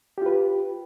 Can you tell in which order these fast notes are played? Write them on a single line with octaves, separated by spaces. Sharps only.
G4 F4 B4